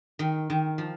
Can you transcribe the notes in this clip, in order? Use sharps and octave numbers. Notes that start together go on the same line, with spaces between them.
D#3
D#3
F3